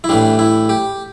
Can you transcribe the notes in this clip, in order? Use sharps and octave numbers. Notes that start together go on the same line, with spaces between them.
E4
A2 E3 G3 D4
E4
G4